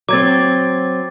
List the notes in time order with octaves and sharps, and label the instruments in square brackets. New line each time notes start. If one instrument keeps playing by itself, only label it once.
[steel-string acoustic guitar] F#3 C4 [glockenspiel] D6 G#6 A6